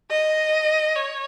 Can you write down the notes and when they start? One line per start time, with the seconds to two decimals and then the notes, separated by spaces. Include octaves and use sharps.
0.11 D#5
0.96 C#5